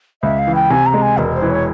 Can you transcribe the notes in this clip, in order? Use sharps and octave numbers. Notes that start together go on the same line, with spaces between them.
C#2 E5
F5
E3
G5
C3 G#5
A#5
G#3
G#5
E1 A#4
C5
E3
C#5